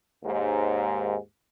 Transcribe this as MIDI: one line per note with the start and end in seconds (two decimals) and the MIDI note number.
0.24 1.17 39
0.24 1.17 44